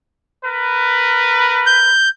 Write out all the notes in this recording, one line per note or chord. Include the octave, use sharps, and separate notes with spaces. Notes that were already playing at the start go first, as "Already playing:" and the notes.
A#4 B4
G6